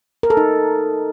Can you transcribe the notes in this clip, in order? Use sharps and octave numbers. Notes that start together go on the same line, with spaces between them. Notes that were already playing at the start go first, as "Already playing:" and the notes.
A#4
A4
D#4